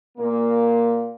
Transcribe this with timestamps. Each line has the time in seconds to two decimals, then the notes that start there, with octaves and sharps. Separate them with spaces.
0.18 A#2 A#3